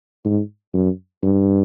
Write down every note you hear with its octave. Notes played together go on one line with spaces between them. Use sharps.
G#2
F#2
G2